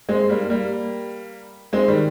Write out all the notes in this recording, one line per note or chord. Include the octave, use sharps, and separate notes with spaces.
G#3 C4
G3 A#3
G3 A#3
G#3 C4
D#3 G3